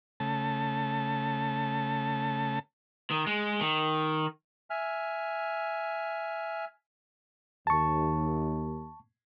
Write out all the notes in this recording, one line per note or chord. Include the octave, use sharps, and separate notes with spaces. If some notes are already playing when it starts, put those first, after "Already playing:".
C#3 A3 A5
D#3
G#3
D#3
E5 G#5 F6
D#2 A5 C#6